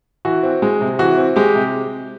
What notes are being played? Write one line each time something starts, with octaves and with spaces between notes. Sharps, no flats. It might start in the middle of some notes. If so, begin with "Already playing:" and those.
E3 F#4
C4
G#3
C3
E3 F#4
C4
G#3 G4
C3